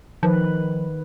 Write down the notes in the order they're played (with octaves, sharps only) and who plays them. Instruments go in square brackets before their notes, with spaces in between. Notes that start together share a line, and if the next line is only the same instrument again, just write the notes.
[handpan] D#3 B4 [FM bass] F3